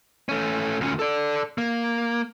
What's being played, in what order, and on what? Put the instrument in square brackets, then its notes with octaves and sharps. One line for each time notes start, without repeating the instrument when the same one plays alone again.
[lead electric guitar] A3 C#4
D2 C#4
A4 D5
A#3